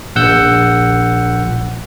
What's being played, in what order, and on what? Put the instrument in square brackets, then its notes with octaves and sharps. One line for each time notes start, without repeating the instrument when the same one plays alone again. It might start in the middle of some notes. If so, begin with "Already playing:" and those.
[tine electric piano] A#1 F#5 E6 G6